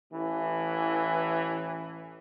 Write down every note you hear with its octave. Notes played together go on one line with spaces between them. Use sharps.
A1 E3